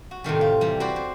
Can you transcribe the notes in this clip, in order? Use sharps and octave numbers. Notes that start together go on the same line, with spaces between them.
F#4
A2 C3 D#3 G3
F4
E3 G3
F#4 B4 C5 D5
C5